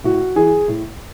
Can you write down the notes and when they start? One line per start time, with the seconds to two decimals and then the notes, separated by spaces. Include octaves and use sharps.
0.04 A2 F#4
0.36 E3 G#4
0.68 A2